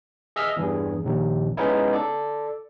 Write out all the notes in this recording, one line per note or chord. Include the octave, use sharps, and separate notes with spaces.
G#4 D#5 E5 E6 F6
E2 G2 G#4
A#1 D#2 A#2
G#3 B3 C#4 D#4 E4
A4 D5